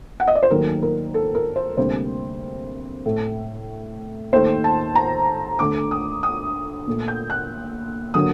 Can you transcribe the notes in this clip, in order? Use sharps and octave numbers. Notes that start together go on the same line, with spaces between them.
F#5
D#5
D5
C5
D#2 D#3 F#3 A3 A#4
A#4
A4
A#4
C5
D2 C3 G3 A#3 C5
A2 A3
D#2 D#3 A3 C5
A5
A#5
D2 D3 A3 D6
D#6
D#6
A#2 A3
G6
F#6
D3 F#3 A#3 D#6